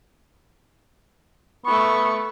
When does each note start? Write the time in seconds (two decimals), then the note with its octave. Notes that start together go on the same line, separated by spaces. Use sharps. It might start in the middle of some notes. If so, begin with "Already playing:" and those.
1.66 A3 B3 C#6